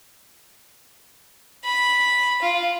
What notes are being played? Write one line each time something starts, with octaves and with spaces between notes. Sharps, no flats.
B5
F4